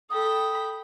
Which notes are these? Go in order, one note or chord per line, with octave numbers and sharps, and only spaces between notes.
A4 G5 B5 D#6